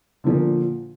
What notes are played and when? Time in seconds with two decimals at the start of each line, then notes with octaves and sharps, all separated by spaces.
0.24 D3
0.26 F3
0.29 A#2